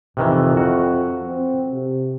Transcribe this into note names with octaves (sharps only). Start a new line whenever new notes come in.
F2 C3 D#3 E3
F#4
C4
C3